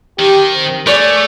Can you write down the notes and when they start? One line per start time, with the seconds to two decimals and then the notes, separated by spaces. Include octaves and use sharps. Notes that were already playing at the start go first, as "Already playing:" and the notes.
0.19 D#3 G4
0.54 C4
0.87 A3 G#4 C#5 D5